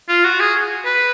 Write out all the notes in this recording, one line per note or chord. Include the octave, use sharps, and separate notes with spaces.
F4
F#4
G#4
B4